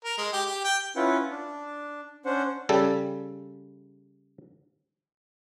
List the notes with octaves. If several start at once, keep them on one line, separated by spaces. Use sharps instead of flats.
A#4
G#3
G4
G4
G5
C#4 E4 F4 B4 F#5
D4
C#4 D4 C5 F#5
C#3 G3 A4